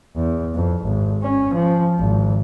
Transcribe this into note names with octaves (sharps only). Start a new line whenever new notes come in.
E2
F2
G#1
C#4
F3
G#1